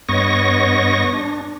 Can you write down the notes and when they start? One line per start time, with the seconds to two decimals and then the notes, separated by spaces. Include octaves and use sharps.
0.09 G2 B3 C#5 D#5 C#6 A#6
1.13 D4